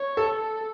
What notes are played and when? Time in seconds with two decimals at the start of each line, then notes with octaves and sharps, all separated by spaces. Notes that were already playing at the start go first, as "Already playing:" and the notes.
Already playing: C#5
0.17 A4
0.30 A4